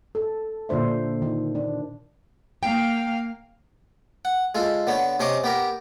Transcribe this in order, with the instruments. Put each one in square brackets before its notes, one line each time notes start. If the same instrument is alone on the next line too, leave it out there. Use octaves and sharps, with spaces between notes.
[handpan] A4
A#2 D3 D4 C5 E5
D#3
D4
[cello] A#3 F5 [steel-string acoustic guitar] G5
[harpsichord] F#5
G#3 F4 A4
D3 B3 C#5
C3 C#4 C5 D#5 C#6 D6
B3 G4 A#4